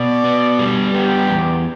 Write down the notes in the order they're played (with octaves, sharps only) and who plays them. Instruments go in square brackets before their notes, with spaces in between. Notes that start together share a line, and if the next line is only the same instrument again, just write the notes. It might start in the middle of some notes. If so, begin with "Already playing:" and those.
Already playing: [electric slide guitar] B2 [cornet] D5
[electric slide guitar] B3
G3
[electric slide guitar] B3 [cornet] G4
[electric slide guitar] E2